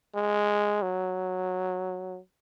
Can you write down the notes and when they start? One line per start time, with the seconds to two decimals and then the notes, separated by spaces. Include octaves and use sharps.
0.15 G#3
0.82 F#3